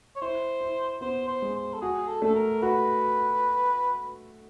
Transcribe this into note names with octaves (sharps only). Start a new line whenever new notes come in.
C#5
E4 C5
E4
B3 C5
C5
G#3
C5
A4
F#4 G#4
A4
A3 A4
A#4
F#4 B4